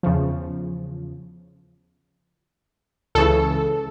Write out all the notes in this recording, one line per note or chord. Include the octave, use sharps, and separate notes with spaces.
E2 C#3 F3
C#2 C#3 E3 A4